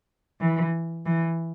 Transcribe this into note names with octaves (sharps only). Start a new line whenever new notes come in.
E3
E3